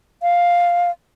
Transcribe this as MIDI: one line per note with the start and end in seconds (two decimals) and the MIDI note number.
0.23 0.91 77